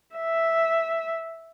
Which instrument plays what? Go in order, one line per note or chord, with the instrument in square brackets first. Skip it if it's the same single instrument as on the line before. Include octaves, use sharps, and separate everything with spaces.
[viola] E5